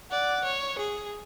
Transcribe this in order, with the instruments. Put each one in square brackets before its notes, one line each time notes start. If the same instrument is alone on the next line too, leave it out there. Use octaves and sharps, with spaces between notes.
[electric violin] D5 [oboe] F#5
[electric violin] C#5
G#4